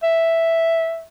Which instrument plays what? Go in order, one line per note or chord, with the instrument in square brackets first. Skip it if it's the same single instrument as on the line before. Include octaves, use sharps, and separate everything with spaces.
[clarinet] E5